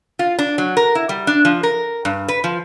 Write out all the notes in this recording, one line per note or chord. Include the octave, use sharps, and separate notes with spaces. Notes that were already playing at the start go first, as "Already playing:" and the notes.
F4
D4
F#3
A#4
E4
G3
D4
F3
A#4
G2
B4
F3